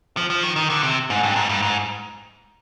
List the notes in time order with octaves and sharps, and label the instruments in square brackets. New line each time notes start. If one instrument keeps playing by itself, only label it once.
[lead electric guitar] F3
F3
D#3
D#3
D3
C3
G#2
G2
G#2
G2
G#2